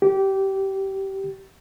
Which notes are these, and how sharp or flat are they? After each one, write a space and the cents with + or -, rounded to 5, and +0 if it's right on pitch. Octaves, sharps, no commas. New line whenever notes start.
G4 -20